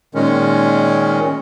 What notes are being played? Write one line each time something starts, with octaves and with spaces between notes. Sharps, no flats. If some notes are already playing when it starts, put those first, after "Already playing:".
A#2 D#3 G#3 C#4